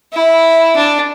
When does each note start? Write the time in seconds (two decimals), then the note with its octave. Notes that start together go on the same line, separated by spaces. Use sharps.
0.13 E4
0.76 D4